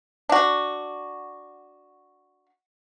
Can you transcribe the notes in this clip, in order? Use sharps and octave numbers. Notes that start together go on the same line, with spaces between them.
D4 F#4